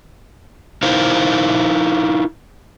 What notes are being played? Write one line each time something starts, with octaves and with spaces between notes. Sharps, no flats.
D#4 E4 A#4 C5 F5